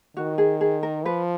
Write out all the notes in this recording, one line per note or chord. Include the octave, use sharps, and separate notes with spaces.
D#3 F#4
G#4
G#4
A#4
F3 B4